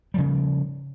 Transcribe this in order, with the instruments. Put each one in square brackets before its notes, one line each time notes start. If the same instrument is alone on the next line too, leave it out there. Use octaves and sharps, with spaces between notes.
[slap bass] C#3 F3 G3